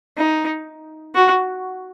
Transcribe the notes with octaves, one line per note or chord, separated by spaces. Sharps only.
D#4
F#4